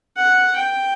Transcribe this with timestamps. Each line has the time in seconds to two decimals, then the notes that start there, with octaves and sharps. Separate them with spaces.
0.17 F#5
0.56 G5